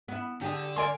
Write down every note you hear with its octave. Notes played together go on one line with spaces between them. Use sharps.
B3 E4
D3 D4 G4 G#4
A#3 A#4 D5 G#5 C6